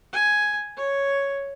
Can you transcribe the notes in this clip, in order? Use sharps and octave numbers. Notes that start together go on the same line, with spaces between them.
G#5
C#5